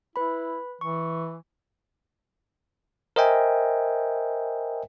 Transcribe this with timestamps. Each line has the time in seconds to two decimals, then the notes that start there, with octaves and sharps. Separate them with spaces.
0.16 E4 B4 B5
0.81 E3 C#6
3.16 A#4 C5 D#5 E5 G5 G#5